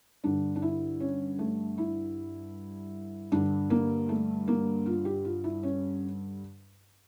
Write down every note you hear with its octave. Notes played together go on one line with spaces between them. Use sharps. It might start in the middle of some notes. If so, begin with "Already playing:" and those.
G2 D3 D4
D4
E4
C#4
A3
E4
G2 D3 D4
A#3
A3
A#3
F4
G4
F4
E4
C#4